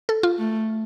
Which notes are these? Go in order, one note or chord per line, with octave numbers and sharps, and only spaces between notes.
A4
F4
A3